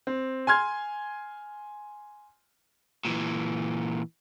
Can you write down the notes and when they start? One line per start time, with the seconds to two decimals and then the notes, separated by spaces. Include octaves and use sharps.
0.07 C4
0.47 G#5 C6 F6 G#6
3.05 A#2 E3